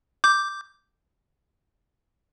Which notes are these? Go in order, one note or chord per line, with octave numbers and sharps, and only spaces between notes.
D6 G6